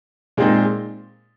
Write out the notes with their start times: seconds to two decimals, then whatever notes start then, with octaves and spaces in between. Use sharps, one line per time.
0.37 A#2 G#3 C4 D#4